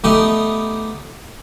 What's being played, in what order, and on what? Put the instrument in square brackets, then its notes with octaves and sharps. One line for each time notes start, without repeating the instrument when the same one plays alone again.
[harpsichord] A3 B3 D#4 G4